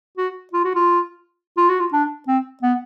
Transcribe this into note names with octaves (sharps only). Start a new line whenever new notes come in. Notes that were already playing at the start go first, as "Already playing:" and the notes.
F#4
F4
F#4
F4
F4
F#4
F4
D4
C4
B3